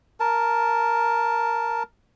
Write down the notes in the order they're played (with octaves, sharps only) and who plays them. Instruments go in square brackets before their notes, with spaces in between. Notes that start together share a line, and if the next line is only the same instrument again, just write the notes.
[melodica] A#4 A5